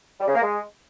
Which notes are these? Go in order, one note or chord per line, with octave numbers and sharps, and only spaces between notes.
G3
C#3
A#3
G#3